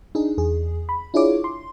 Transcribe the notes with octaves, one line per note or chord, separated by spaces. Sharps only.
D4 D#4 G#4
E2 G#4
B5
D4 E4 F4 G#4 C#5 D6
C6